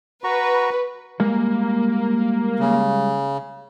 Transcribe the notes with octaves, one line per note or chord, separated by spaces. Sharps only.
F#4 B4 A#5 C#6
G3 G#3 A#3
C#3